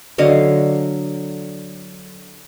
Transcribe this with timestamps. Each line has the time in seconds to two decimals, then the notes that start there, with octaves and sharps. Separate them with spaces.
0.18 D3 F#3 D#5 F5